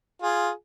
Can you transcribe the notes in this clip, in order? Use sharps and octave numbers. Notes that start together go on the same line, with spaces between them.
F4 G#4